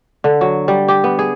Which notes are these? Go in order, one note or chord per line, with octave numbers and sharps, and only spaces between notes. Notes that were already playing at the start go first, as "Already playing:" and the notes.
D3
F#3
G3
G4
B3
G#4